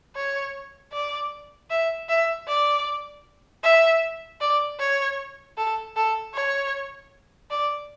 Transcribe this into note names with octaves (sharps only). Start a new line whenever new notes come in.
C#5
D5
E5
E5
D5
E5
D5
C#5
A4
A4
C#5
D5